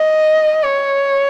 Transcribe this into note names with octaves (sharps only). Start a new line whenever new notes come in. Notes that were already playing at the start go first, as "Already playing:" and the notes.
Already playing: D#5
C#5